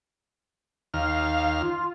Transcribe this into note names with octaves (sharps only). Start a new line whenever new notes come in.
D#2 F5 F6
F4